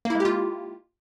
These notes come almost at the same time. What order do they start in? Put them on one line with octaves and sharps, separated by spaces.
A#3 E4 G#3 G4 F4